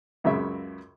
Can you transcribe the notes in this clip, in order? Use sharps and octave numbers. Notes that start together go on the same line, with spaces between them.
C#2 F#2 C#3 E5